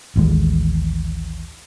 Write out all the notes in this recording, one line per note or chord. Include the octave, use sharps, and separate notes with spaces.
A1 D#2 G#3